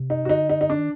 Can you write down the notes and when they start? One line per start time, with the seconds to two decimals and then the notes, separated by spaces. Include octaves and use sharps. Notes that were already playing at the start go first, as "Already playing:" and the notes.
Already playing: C3
0.10 D#4
0.25 F#4
0.29 D3 D#4
0.49 D#4
0.61 D#4
0.70 D4
0.78 D#3